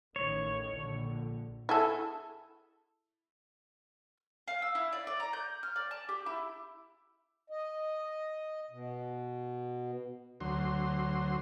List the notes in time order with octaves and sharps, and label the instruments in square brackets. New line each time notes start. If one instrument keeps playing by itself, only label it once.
[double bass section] A1 D#3 [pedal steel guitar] C#5
[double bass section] A#1 D3
[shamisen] E4 G#4 A4
[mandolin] F5
E6
E4
D5
D5
A#5
G6
F6
D5
A5
G4
E4
[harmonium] D#5
B2
[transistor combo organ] D2 F#3 C6